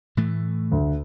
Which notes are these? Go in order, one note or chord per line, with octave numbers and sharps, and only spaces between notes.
A2 E3 A3
D2